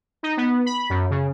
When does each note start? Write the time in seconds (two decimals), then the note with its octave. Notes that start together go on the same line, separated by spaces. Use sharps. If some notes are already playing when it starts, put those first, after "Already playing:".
0.23 D#4
0.37 B3
0.66 B5
0.90 F#2
1.10 C#3